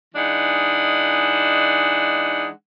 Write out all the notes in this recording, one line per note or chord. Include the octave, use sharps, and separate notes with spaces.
E3 G#3 D4 D#4 F#5